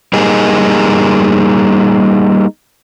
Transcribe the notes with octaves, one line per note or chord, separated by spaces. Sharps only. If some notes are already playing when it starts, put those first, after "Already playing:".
G3 A#3 D#4 G#4